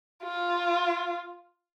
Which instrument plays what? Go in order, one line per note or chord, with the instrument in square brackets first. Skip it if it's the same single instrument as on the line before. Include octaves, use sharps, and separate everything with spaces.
[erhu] F4